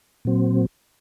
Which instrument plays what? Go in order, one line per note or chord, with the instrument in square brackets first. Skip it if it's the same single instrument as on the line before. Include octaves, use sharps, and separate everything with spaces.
[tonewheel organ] A#2 F#3 C4